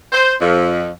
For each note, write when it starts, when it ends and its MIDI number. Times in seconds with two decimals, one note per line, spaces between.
0.13 0.33 72
0.41 0.89 41